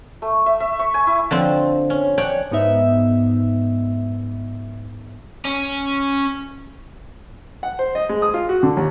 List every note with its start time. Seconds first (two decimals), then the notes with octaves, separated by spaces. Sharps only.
0.22 A3
0.46 E5
0.60 E5
0.79 C#6
0.94 G#5
1.07 E4
1.31 D3 F3 C4
1.90 C#4
2.18 D4 C#5 F#5 G5
2.51 G#2 B3 D#4 E5
5.45 C#4
7.63 F#5
7.79 C5
7.95 D#5
8.09 G#3
8.22 D#6
8.34 F4
8.49 F#4
8.63 D3
8.77 D#2